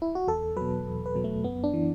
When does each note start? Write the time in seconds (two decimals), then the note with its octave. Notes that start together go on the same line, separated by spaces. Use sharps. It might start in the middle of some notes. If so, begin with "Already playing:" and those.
0.02 E4
0.15 F#4
0.27 E2 A4
0.56 B2 F#3 B4
0.87 E2
1.06 B4
1.15 B2 F#3
1.24 A3
1.44 F#2 B3
1.64 D4
1.73 E3